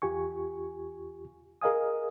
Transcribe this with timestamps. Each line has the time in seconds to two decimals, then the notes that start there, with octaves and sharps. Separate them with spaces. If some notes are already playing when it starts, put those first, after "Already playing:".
0.02 E2 F4 G4 G#5 C#6
1.61 G#4 A#4 D#5 F5 G#5 D#6